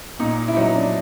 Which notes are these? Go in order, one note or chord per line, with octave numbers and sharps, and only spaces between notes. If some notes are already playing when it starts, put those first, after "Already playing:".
A#2 D#4
E4
F#3 D#4
D4